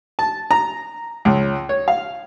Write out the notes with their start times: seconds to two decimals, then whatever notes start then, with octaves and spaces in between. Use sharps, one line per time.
0.19 A5
0.51 A#5
1.25 C#2
1.69 C#5
1.88 F5